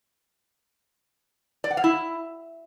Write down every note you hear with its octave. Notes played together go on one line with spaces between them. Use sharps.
D5
F#5
F5
E4